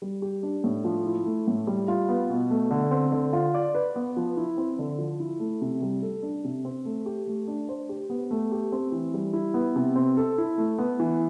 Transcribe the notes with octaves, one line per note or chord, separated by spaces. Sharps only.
G3
G4
D4
A2
F3
E4
A3
A2
G3
F4
B3
B2
A3
D3
C4
D3
F4
D5
B4
B3
F3
E4
C4
D3
F3
E4
A3
C3
G3
A4
D4
C3
C4
A3
G4
A3
D4
C5
G4
B3
A3
G4
C4
E3
G3
E4
B3
C3
C4
A4
E4
A3
B3
E3